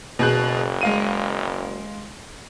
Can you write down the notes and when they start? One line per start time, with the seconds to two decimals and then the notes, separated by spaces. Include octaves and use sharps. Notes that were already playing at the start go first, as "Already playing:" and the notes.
0.19 F#1 B2 G#4 F#6
0.81 G#3 F5 D#7